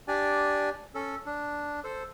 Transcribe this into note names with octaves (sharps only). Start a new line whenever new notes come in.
D4 G4 D5 G#5
C#4 A4
D4
A4 C5